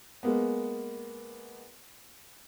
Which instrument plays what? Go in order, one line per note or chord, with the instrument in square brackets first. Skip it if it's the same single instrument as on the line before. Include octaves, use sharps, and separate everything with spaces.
[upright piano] G#3 A#3 B3